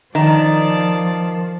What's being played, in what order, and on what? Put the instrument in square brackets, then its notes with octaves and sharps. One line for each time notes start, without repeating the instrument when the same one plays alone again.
[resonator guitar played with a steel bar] D#3 [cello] F3 [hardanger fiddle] D5 A5